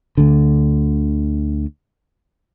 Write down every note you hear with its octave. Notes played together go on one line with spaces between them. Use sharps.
D2 D3